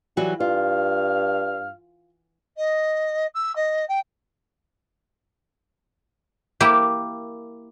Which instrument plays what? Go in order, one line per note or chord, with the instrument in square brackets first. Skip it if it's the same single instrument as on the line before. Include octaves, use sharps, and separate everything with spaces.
[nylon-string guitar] E3 F#3 F#4 [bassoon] G3
[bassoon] G2 [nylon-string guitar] F4 [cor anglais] F5
[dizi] D#5
E6
D#5
G5
[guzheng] A#3 E4 G4